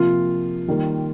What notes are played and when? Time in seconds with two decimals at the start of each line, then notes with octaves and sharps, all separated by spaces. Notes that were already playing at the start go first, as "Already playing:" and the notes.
Already playing: C3 F3 A#3 F4
0.68 D#3 G3 A#3